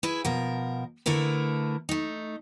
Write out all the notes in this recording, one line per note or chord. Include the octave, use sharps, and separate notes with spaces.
E4 G#4 B4
B2 F3 A#4
D3 A3 E4 A#4 B4
A3 D#4